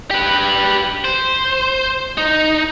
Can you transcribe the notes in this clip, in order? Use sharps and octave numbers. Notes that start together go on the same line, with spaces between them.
G4 B4
C5
D#4